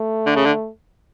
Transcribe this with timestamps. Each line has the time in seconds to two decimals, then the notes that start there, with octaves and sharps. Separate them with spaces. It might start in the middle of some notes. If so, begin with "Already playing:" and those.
Already playing: A3
0.26 D3
0.36 C#3
0.46 D3